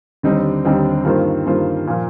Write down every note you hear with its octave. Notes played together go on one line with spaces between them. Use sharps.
D#2 D3 G3 C4 D#4
D#2 D3 G3 C4 D#4
G2 D#3 A#3 F4 C5
G2 D#3 A#3 F4 C5
A#2 F3 A#3